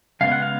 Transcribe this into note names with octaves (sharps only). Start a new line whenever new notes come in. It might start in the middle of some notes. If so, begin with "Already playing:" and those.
C#3 G#3 B3 F5
F#5
F5